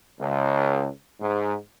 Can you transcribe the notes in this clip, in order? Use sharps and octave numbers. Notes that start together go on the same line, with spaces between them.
C#2
G#2